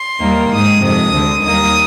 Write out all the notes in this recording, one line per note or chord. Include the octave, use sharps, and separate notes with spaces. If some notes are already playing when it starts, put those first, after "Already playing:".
Already playing: C6
D#2 D#3 G3 A#3
G#2 D#3 G#3 D#6
F2 C3 D#3 G#3 D#6
D2 D3 G#3
D#2 D#3 G3 A#3 D#6